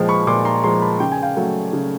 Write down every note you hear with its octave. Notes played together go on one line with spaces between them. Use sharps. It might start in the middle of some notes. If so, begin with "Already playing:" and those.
Already playing: A#2 F3 G#3 G5 A5
B5 C#6
A#2 C6 D6
A#5 C6
F3 G#3 A#5 C6
A5 B5
C#3 G5
G#5
F5 G5
F#3 A3
C#3